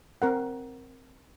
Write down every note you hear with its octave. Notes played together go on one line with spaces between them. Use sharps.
C4 A#4 F#5